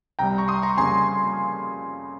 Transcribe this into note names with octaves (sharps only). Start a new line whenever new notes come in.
C2 C3 G3 G5 A#5
A#5 C#6
C6 D#6
A#5 C#6
F2 C#3 G3 A#3 C#4 G#5 C6